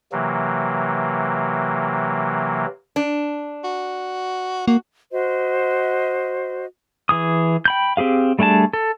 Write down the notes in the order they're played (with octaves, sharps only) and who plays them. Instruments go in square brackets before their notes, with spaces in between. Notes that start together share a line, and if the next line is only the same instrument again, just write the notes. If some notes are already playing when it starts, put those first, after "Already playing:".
[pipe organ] C3 E3 F#3 A#3
[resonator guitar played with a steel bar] D4
[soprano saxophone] F#4
[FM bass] A#3 [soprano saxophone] F#4
[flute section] F#4 C5 D#5
[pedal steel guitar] E3 G#4 D#6
G5 B5 G6
C4 G4 G#4 F5
G3 A3 D4 G#4 A5
A4